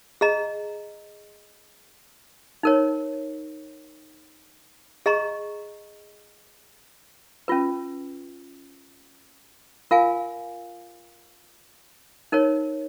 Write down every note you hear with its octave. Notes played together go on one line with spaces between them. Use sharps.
G#4 D#5 A#5
D#4 A#4 C#5
G#4 D#5 A#5 C#6
C#4 F4 B4
F4 A#4 F5 G#5
D#4 A#4 C#5